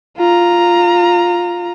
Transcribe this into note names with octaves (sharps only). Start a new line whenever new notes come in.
F4 A#5